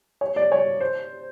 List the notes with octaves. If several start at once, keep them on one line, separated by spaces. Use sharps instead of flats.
C#5
D5
C#5
C5